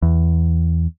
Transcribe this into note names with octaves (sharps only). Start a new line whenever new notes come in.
E2